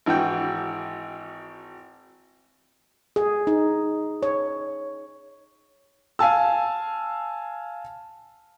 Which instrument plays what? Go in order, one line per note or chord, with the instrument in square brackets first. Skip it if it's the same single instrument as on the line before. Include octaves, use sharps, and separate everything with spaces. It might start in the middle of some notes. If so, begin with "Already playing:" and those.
[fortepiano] G#1 E3 F#4 G5
[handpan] G#4
D#4
C#5
[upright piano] F5 G#5 A5 E6